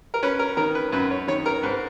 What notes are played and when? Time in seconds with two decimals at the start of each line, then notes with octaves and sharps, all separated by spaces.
0.14 A#4
0.23 C#4 B4
0.39 A#4
0.57 D#3 A#4
0.75 B4
0.92 F#2 B4
1.11 C#5
1.28 D#3 C#5
1.46 A#4
1.63 G#2 B4